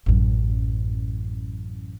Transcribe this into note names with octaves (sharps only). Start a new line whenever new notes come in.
A1 F#2